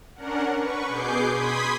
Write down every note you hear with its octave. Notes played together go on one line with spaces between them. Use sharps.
C#4 D4 A#4 F#5
B4 C#6
B2 G#4 D6 G6 C7
B5 C6 D#6 G#6 B6